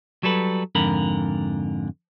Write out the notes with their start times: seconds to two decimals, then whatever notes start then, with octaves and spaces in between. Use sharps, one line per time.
0.23 F#3 G3 A4 B4
0.75 F2 G#2 D3 A#4 B5